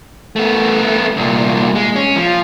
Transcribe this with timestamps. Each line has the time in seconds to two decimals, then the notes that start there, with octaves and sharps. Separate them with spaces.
0.36 A3 B3
1.17 C2 A#2
1.75 G#3
1.96 C#4
2.16 F3